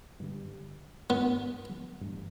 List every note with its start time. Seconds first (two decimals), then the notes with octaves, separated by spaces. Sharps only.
0.20 G2 D3 G3
1.10 G2 G3 B3 D4
2.01 G2 E3 A3 D4